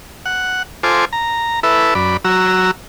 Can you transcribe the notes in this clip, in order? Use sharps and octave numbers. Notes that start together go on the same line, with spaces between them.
F#5
F4 A4 C5 G#5 D6
A#5
E4 A4 B4 E5
F#2 D5 B5
F#3 F#4 A#5 E6